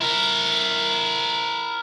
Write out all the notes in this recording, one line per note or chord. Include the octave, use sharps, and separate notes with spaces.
E4 A#4